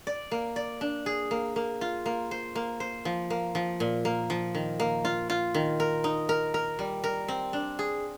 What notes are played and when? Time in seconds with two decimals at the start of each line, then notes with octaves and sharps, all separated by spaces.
0.07 D5
0.31 A#3
0.56 D5
0.81 D4
1.06 G#4
1.31 A#3
1.56 A#3
1.81 F4
2.06 A#3
2.31 C5
2.55 A#3
2.80 C5
3.05 F3
3.30 A#3
3.55 F3
3.80 A#2
4.05 A#3
4.30 F3
4.55 D#3
4.80 A#3
5.05 F4
5.30 F4
5.54 D#3
5.80 A#4
6.04 D#4
6.29 A#4
6.54 A#4
6.79 G3
7.04 A#4
7.28 C4
7.53 D4
7.79 G#4